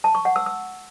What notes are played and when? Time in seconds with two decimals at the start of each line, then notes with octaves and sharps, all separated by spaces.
0.04 A5
0.15 C#6
0.25 F#5
0.36 E6
0.46 E6